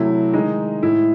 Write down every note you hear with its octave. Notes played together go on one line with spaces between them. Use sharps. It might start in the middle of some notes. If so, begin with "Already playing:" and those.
Already playing: C3 F#3 A3 E4
D#3 G#3 D#4
A2 G#3 E4